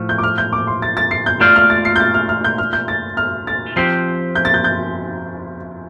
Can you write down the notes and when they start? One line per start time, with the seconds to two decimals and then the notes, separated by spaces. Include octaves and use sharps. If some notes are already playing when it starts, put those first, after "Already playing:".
Already playing: A2 F3 A3
0.09 G6
0.18 D6
0.23 F6
0.38 G6
0.53 D6
0.67 C6
0.82 A6
0.97 A6
1.11 C7
1.26 G6
1.40 A3 F4 D5 F5 G6
1.56 F6
1.70 A6
1.85 C7
1.96 G6
2.00 A6
2.14 F6
2.29 F6
2.44 G6
2.58 F6
2.73 G6
2.88 A6
3.17 F6
3.47 A6
3.76 F3 C4 G4 C5 C7
4.35 G6
4.45 A6
4.54 G6
4.64 G6